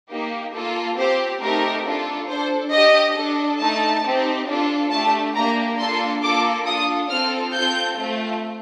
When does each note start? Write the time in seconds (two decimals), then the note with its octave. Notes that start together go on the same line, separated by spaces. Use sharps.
0.10 A#3 D#4 G4
0.54 A#3 F4 A4
0.97 C4 G4 C5
1.41 A3 C4 D#4 G4 A#4
1.85 D4 F4 A4
2.28 D4 A4 C5
2.73 D4 G4 D#5
3.16 D4 A4
3.60 A3 D#4 A4 A5
4.04 C4 D#4 G4
4.47 D4 F4 A4
4.91 A3 D4 G4 A5
5.35 A#3 D4 G4 A#5
5.78 A#3 D4 F4 A4 C6
6.23 A#3 F4 A4 D6
6.66 D4 F4 A4 D#6
7.10 C4 F4 A4 F6
7.54 C4 F4 A4 G6
7.98 A3 C4 F4